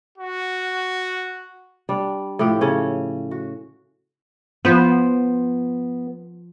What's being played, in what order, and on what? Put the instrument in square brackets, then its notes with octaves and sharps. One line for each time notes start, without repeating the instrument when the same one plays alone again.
[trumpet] F#4
[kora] G3 D4
A2 F3 G4
C#3 C#4 A4
F#4
[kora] F3 C5 [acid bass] B3